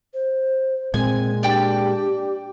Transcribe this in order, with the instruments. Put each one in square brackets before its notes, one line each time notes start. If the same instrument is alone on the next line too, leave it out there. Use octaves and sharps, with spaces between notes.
[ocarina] C5
[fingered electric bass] A#2 G#3 [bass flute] C4 [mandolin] G#5
[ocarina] D4 [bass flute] G4 [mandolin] D5 G5 A5